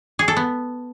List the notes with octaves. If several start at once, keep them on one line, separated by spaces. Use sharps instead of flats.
G#4
A4
B3